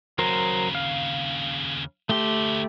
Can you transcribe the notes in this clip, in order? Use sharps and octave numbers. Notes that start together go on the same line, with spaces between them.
D#2 C#3 F#3 A#4 C5
F5
D2 A3 G4 C6